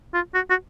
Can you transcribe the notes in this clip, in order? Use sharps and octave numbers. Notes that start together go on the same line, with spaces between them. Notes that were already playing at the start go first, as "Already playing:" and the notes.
F4
F#4
F#4